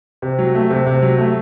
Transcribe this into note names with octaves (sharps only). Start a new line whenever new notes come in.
C3
F#3
A3
C3
C3
F#3
A3